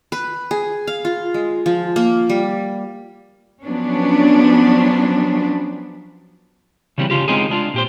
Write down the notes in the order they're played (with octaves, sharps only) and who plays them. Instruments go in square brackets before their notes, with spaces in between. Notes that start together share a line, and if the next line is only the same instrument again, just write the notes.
[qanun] B4
G#4
F5
F4
G#3
F3
A#3
G3
[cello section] F3 F#3 B3 C#4 D4
[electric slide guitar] C#3 E3 G3 C4
C#3 E3 F4 G4
C#3 G#3 C4 D#4 F4 G#4
G#3 D4 F4
A#2 G4 C5